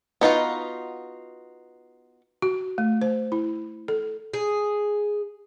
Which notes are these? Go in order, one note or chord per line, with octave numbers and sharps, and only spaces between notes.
B3 D#4 F4 F#4
F#4
A3
C5
E4
A4
G#4